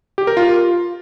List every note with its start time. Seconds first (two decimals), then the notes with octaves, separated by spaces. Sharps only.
0.18 G4
0.27 A#4
0.37 F4